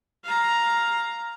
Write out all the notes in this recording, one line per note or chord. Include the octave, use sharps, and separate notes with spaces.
F5 A#5